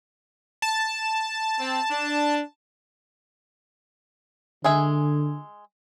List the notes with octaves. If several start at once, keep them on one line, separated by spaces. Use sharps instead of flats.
A5
C4
D4
D3 G#3 G#4 E5